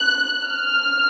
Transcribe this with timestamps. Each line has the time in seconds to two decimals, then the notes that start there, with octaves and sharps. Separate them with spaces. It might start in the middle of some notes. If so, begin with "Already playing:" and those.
Already playing: F#6
0.45 F6